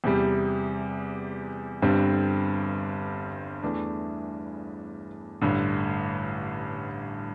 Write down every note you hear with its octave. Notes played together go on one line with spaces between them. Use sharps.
E2 C3 G3
G1 G2 D3 G3 C4
E2 E3 A3 D4
A1 G2 D3